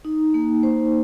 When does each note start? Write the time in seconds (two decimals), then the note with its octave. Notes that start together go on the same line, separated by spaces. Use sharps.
0.05 D#4
0.34 A#3
0.63 C5